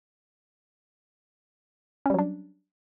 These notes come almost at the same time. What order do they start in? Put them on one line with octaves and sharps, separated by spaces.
C#4 G3 F#3 D4